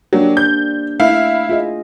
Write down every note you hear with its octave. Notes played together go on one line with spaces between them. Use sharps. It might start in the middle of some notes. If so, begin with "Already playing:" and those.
F#3 A#3 D4 G4
C5 G6
A3 E4 F5
F4 G#4 D#5